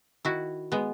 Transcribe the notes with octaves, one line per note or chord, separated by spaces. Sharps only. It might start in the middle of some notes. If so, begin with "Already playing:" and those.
D#3 E4 F#4
G#3 B3